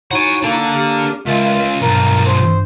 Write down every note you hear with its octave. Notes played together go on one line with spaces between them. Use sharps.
D#4 E4 F#4 C#5 F#5 G#5
A#3 D4 A4
G4 F6
C#2 G#3 F4 A#4 E5
B1 G2 F3 A#4
C5